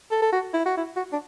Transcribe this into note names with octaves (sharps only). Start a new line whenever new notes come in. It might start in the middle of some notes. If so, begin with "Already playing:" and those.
A4
A4
F#4
E4
F#4
E4
F#4
D4